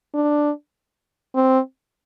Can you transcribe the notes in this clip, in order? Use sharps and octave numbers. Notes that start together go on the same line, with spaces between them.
D4
C4